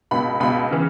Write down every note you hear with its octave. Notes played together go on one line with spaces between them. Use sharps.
C#2 B2 B5
C#2 B2 B5
C#3 E3